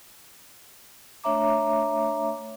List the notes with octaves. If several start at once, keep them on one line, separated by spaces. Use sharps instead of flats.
A3 D4 C#5 E5 A#5 D6